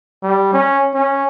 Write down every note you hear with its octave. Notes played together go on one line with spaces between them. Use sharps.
G3
C#4
C#4